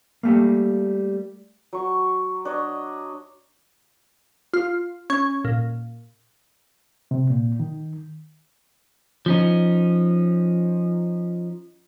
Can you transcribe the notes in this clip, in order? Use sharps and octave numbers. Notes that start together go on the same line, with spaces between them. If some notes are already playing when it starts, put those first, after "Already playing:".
G3 A3 A#3
F#3 C#6
D4 C#5 D#5
F4
C#4
A#2
C3
A#2
D#3
F3 C#4 D#4